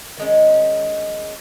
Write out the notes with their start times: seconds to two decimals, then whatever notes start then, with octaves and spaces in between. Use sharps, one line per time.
0.17 D#3 G#3 C#4